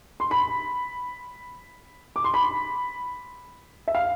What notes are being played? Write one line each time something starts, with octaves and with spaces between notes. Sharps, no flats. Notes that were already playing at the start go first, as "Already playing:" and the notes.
C6
B5
D6
C6
B5
E5
F5